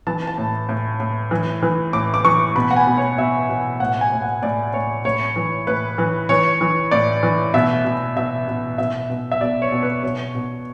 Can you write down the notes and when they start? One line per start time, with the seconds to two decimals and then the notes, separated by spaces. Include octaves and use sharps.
0.07 E3 A5
0.27 A5
0.38 A2
0.69 A2
1.00 A2
1.31 E3
1.63 E3
1.93 A2 D6
2.14 D6
2.25 E3 C#6
2.55 B2 B5
2.71 F#5
2.76 G#5
2.87 B2
2.97 C#5
3.18 B2 E5
3.49 B2
3.80 A2 F#5
4.01 G#5
4.12 A2
4.22 F#5
4.42 A2 D5
4.73 A2 C#5
5.05 A2 C#5
5.36 E3
5.67 A2 B4
5.98 E3
6.29 E3 C#5
6.61 E3
6.91 A2 D5
7.23 E3
7.54 B2 E5
7.85 B2
8.16 B2 E5
8.48 B2
8.78 B2 E5
9.10 B2
9.32 E5
9.41 B2 D5
9.62 C#5
9.72 B2
9.83 B4
10.03 B2 C#5
10.35 B2